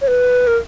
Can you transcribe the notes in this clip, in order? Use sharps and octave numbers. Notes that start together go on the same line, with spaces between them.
C#5
B4
A#4